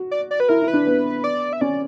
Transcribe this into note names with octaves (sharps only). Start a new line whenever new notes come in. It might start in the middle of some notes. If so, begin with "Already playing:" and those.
Already playing: F#4
D5
D5
B4
E4 A#4
E4
B4
D4
B3
D5
E5
C#4 D5